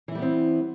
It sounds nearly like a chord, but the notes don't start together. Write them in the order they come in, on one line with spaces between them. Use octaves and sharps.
E3 E4 G3 B3 C4